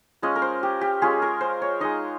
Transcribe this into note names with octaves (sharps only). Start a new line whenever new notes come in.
G#3 C#4 F4 D#5
A#4
C5
G4
G4
G#3 C#4 F4 G#4
A#4
C5
C#5
G#3 D#4 D#5